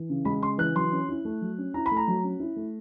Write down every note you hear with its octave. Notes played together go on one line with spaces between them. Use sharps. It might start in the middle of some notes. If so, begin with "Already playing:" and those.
Already playing: E3
C#3
G#3 B5
C#3 C6
E3 F#6
F#3 C6
C#4
E4
A3
F#3
C#4
E4 A#5
B5
A3
A#5
F#3
C#4
E4
A3